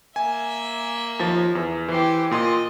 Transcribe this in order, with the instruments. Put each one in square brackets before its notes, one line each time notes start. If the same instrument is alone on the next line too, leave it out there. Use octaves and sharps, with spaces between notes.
[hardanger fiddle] A#3 E5 [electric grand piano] G#5
[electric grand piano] D#2 F3 A6
E2
[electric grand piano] E3 C7 [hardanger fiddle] G4 C5
[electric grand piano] A#2 C6 D#6 [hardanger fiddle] D#5